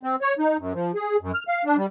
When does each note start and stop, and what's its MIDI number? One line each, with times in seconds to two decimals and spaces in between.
0.03 0.16 60
0.22 0.34 73
0.39 0.57 63
0.58 0.73 42
0.74 0.92 53
0.95 1.16 68
1.21 1.32 42
1.34 1.44 89
1.48 1.64 77
1.65 1.76 62
1.77 1.86 55